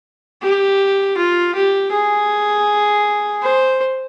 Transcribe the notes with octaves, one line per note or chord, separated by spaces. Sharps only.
G4
F4
G4
G#4
C5